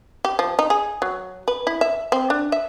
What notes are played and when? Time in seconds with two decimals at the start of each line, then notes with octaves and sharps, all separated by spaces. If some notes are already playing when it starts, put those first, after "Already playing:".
0.25 G4
0.39 F3
0.59 D#4
0.70 G#4
1.02 F#3
1.48 B4
1.67 E4
1.81 E5
2.12 C4
2.30 D4
2.52 E5